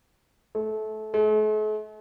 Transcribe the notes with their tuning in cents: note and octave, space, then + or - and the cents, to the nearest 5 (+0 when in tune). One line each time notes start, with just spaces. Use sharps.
A3 -20
A3 -45